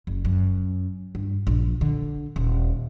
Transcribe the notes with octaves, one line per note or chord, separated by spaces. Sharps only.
F#1
F#2
G2
A#1
D3
D#1